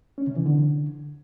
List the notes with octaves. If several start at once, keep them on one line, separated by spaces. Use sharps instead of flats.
C#4
C3
E3
D3